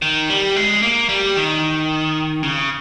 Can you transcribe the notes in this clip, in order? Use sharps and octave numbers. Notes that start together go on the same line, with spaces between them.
D#3
G3
G#3
A#3
G3
D#3
C#3